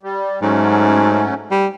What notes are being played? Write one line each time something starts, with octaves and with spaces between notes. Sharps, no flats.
G3
G#2 F#3 A3 C#4
G3